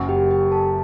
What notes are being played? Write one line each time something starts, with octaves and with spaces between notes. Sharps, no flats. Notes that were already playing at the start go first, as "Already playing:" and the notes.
Already playing: F#1 F#2 F#3
G4 G5
G4 G5
A4 A5